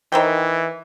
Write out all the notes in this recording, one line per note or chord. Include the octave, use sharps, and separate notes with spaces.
D#3 E3 C5 G5